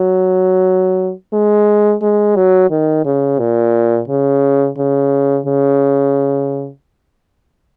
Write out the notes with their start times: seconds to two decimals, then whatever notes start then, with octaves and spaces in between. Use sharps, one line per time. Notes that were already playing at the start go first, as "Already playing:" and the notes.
Already playing: F#3
1.33 G#3
2.02 G#3
2.36 F#3
2.71 D#3
3.05 C#3
3.39 A#2
4.08 C#3
4.77 C#3
5.46 C#3